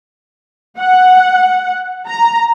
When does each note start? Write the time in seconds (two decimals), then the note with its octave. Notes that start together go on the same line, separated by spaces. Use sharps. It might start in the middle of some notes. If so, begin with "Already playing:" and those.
0.79 F#5
2.08 A#5